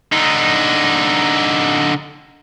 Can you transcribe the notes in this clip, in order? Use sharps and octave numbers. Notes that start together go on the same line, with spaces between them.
D3 D#4